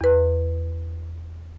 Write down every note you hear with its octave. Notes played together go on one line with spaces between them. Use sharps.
E2 B4